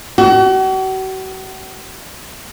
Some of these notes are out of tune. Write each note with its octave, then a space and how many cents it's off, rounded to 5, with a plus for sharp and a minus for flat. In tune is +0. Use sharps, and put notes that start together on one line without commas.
F#4 +40